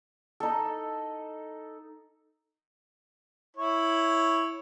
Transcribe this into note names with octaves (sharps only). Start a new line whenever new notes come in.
D#4 A4
E4 C#5